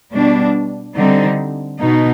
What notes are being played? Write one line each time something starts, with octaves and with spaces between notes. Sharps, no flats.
B2 G3 D4
D3 G3 C4 D#4
B2 B3 D#4